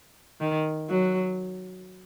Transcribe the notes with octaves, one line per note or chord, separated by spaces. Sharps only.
D#3
F#3